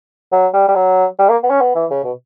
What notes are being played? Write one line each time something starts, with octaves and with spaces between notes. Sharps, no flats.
F#3
G3
G3
F#3
G3
A#3
B3
C#4
B3
E3
C#3
B2